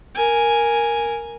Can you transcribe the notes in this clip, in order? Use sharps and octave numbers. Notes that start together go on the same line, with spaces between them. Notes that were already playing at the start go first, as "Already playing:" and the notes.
A#4 G#5